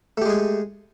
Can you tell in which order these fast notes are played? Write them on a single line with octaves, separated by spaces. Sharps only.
A3 G4 G#3 G#4